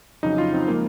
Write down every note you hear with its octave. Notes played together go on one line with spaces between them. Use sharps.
F2 C#3 F#3 D#4
F4
C4
F3 G#3 A#3